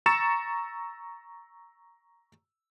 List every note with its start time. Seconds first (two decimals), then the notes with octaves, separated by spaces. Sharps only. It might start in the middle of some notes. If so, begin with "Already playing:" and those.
0.06 A#5 C#6 E6 A6 C#7 E7